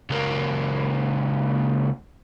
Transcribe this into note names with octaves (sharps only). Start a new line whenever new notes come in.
C#2 A#3